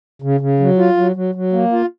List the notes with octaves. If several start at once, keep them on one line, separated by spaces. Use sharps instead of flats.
C#3
C#3
F#3
F4
F#3
F#3
F#3
A#3
F4